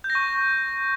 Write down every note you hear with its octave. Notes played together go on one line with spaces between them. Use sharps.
G6
A#6
C#6